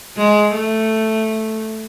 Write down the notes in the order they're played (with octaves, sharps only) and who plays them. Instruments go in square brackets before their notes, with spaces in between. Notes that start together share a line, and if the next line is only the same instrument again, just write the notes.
[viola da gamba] G#3
A3